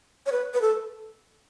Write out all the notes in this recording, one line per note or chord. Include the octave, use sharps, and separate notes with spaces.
C#5
B4
B4
A4